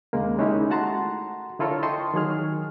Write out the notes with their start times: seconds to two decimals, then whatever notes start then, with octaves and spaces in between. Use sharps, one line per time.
0.13 D#2 C#3 G#3 A#3
0.38 G#3 C#4 D#4 E4 G4
0.70 A3 F#4 F#5 A5 A#5 C6
1.59 D3 E4 F4 A4 A#4 C#5
1.83 D#5 G5 A5 C6 C#6
2.14 D#3 F#3 G#4 F6